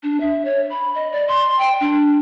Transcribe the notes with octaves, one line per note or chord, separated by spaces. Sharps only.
D4
E5
C#5
B5
D#5
D5
C6
G5
D4